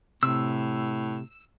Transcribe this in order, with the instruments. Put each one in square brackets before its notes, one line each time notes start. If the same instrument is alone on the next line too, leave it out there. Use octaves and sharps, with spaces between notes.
[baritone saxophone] A2 [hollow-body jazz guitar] C3 [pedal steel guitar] E6